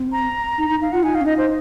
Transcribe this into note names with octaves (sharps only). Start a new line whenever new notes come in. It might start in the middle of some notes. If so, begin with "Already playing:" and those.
Already playing: C4
A#5
D#4
D#4
D#4 F5
F4 F#5
D#4 G#5
F5
C#4
D#4 D#5
C5